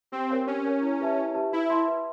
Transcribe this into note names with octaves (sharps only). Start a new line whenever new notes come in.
C4 G4
A#4 C#5 F5 G#5
C#4 G4
A#4 C#5 F5 G#5
E4
G4 B4 E5 A5
E4
G4 B4 E5 A5
E4 B4
E5 A5 C6
B4